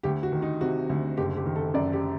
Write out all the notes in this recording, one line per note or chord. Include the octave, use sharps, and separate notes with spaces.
D2 G4
F#4
D#3
D#4
C3 F#4
D2
F#1 G4
G4
D#3
A4
F#2 D5
G4